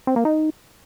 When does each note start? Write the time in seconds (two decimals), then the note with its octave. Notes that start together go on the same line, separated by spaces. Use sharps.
0.07 C4
0.16 A#3
0.25 D#4